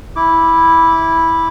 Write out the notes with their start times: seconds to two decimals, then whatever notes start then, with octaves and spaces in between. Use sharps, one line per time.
0.16 E4 D6